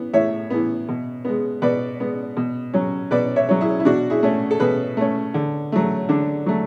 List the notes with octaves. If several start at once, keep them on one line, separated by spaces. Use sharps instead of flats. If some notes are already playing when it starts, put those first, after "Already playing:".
Already playing: E3 B3
A2 C#5 E5
E3 B3
B2
G#3 B3
B2 B4 D5
G#3 B3
B2
F#3 C#4
B2 B4 D5
C#5 E5
F#3 C#4
E4 G#4
E4
B2 D4 F#4
E4 G#4
A3 C#4
A4
B2 G#4 B4
A3 C#4
D3
F#3 A3
D3 D4
F#3 A3